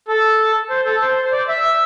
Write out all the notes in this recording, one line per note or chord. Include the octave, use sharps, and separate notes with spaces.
A4
C5
A4
C5
C5
D5
E5